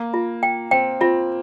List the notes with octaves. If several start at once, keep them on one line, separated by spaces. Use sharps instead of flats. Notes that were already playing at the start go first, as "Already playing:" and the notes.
Already playing: A#3
F4
G5
C4 G5
C4 F4